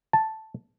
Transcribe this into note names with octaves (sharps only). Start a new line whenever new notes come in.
A5